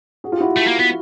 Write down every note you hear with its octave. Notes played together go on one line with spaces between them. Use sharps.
F#4 G#4
F4 G4
E4 F#4
A3
A#3
B3